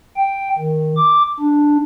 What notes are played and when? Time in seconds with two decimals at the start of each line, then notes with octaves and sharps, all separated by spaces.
0.17 G5
0.58 D#3
0.97 D6
1.40 D4